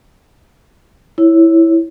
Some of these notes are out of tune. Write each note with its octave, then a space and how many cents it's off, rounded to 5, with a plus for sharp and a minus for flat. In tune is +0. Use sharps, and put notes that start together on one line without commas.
E4 +0 C#5 -5